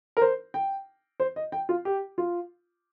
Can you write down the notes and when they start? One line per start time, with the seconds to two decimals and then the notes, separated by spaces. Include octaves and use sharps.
0.17 A#4
0.22 C5
0.54 G5
1.20 C5
1.36 D#5
1.52 G5
1.69 F4
1.85 G4
2.18 F4